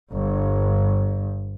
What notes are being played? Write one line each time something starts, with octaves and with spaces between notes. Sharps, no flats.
G1 G2